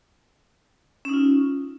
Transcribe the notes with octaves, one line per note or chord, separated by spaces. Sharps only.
C#4 D#4 F4